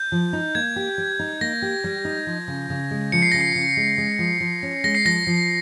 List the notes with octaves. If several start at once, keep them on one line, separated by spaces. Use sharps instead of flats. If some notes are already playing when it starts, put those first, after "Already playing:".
Already playing: G6
F3
D#4
A#3 G#6
G4
G3
D#4
A#3 A#6
G4
G3
D#4
F3
C#3
C#3
G#3
F3 C#7
C7
C#3 A#6
C7
C#3
G#3
G#3
F3
F3
C#4
G#3 A#6
C7
F3 A#6
F3